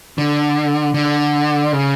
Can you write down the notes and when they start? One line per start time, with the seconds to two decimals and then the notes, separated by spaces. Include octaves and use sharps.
0.18 D3
0.94 D3
1.73 C#3